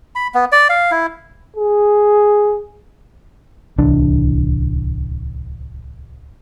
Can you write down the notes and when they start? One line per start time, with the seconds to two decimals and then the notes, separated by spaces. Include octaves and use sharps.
0.15 B5
0.34 B3
0.52 D5
0.69 F5
0.91 E4
1.56 G#4
3.78 D1 C2 E3 D4